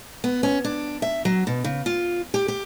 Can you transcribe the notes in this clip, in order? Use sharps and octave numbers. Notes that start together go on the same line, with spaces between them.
B3
C#4
D4
E5
F#3
B2
C#3
F4
G4
G4